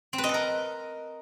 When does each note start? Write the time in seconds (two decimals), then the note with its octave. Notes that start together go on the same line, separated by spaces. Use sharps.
0.13 C4
0.18 B4
0.24 D#5
0.29 A4
0.34 A#4